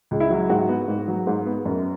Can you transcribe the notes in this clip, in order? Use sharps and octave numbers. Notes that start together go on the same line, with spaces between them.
C#2
E4
F#3
G#2 F#4
B3
G#2
F#3
G#2
B3
F#2